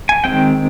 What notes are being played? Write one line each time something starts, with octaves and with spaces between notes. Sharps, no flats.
G#5
D#3 G#3 C4 G5